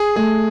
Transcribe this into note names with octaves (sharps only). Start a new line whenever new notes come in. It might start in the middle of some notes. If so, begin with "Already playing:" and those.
Already playing: G#4
A3 G#4